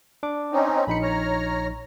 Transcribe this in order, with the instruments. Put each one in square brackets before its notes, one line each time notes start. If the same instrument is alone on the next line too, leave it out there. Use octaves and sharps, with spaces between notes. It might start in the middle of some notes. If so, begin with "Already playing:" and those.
[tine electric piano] D4 D6
[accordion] C4 C#4 D#4
[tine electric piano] A#1 D#4 C#7 [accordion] B5
[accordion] C#5 A#5 F6